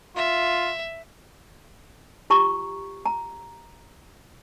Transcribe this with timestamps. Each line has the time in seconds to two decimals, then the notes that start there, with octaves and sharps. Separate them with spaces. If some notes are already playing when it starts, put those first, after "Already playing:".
0.16 F4 E5
2.30 F4 G4 A#5 C#6
3.06 A#5